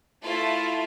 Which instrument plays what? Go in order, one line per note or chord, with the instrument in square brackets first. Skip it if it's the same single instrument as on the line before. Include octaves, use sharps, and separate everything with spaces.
[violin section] A3 E4 F4 A4